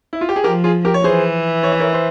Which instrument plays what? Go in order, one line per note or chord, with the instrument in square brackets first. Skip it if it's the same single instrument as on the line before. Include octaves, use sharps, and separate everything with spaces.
[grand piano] E4
F4
G4
G#4
[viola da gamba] F3 [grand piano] G4 A#4
[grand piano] F4 G#4
G4 A#4
C#5
[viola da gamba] E3 [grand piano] G#4 C5
[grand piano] C#5
E5
A#4 C#5
C5 E5